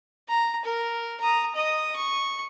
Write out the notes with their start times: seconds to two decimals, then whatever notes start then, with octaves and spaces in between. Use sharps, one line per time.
0.28 A#5
0.65 A#4
1.21 A#5 D#6
1.55 D#5 D#6
1.96 C#6